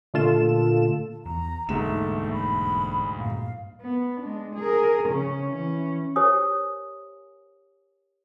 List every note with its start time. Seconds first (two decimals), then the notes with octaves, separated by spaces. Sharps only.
0.14 A#2 D3 A3 F4 A4 E7
1.25 E2 A#5
1.69 E1 D2 G#2 A3 A#3 D4 E7
2.32 B5
3.18 G2 A#2 F5
3.81 B3
4.21 G#3 D4
4.56 G#4 A#4
5.09 C#3 C#4
5.51 E3 C#4
6.16 G4 A#4 C5 C#5 G#5 D#6